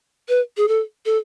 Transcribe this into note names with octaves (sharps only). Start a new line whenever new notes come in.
B4
G#4
A4
A4